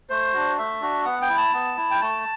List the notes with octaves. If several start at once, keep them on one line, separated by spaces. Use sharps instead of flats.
A3 C5
D4 F#4
A3 E5
D4 F#4
B3 F#5
G5
E4
A5
B3
E4
G5
A3 A5